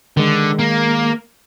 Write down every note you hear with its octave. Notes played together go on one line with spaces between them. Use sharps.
D3 D#3 G#3
A#3